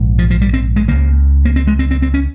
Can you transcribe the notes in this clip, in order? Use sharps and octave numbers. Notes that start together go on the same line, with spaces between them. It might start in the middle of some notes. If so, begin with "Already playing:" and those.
Already playing: A#1 G#2
F3
F3
G3
C4
G#3
C#2 C#3 A#3
A#3
C4
G#3
C4
C4
C4
C#4